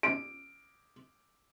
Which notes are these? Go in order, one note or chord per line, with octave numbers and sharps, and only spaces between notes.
D7